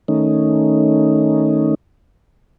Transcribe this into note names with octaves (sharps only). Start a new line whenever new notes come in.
D#3 A3 C#4 D#4